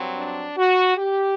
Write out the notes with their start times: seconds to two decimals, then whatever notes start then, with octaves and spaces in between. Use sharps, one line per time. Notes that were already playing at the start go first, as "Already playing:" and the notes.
Already playing: G2 F#3 C4
0.16 D4
0.57 F#4
0.97 G4